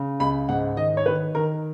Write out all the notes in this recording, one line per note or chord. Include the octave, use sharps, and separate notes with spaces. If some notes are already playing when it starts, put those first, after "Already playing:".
Already playing: C#3
C#2 B5
G#2 F#5
D#3 D#5
C#5
D#3 B4
D#3 A#4